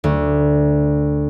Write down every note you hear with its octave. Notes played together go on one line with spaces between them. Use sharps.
D2